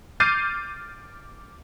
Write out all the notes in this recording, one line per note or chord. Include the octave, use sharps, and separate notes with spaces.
D6 F6 G6 A6 C7 D#7